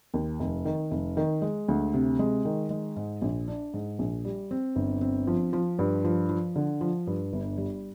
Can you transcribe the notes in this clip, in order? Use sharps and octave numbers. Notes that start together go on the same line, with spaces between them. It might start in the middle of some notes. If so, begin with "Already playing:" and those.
D#2
F1
D#3
F1
D#3
G#3
D2
C3
G#3
D#3
G#3
G#2
A#1
D4
G#2
A#1
G3
C4
G1
C4
F3
F3
G2
F3
F3
D3
F3
G2
G1
G3